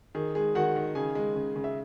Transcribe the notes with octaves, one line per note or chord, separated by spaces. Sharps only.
D#3 G#4
G#3 G#4
D#3 F#4 F#5
D#3
C#3 G#4 G#5
G#3
C#3
C#3
E5